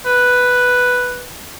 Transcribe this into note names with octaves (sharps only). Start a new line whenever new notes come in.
B4